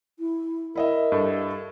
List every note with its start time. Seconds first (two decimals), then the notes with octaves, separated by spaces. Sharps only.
0.19 E4
0.75 E4 A#4 D#5 E5
1.12 G2 A4